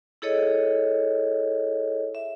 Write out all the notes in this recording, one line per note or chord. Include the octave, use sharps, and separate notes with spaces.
E4 G#4 A4 C#5 D#5
E5